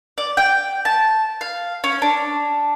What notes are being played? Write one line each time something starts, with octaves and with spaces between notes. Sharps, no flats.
D5
G5
A5
F5
C#4
D4